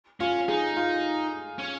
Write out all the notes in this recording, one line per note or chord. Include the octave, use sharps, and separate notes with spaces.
C#4 F4
D#4 G#4
F4
C#4